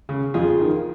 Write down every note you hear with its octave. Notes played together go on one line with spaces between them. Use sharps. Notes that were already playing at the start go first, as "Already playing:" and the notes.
C#3
F2 F4 G#4
D#3